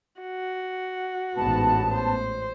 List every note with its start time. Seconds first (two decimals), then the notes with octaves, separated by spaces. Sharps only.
0.21 F#4
1.36 A1 G#2 B3 A5
1.92 C5